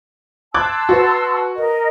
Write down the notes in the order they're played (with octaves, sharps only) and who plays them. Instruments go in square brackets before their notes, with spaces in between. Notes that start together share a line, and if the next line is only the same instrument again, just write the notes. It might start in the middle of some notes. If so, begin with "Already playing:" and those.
[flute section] A5 C6 E6 [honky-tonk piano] D6 F#6 G#6
[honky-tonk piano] F#4 B4
[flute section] A#4 D#5